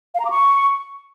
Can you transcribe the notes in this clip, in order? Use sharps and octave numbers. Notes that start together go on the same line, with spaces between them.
F5
A#5
D6
C#6